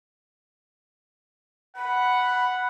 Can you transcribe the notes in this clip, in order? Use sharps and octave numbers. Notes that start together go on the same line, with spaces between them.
F#5 B5